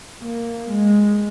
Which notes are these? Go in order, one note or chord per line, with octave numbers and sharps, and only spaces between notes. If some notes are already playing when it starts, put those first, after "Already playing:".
A#3
G#3